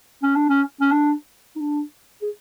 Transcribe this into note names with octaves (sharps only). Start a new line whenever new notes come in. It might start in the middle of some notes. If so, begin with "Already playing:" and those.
C#4
D4
C#4
C#4
D4
D#4
D4
G#4